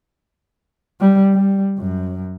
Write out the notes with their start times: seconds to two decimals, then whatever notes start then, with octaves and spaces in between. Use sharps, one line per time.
1.01 G3
1.33 G3
1.78 F#2